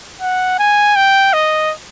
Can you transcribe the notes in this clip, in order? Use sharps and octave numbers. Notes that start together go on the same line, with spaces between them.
F#5
G#5
G5
D#5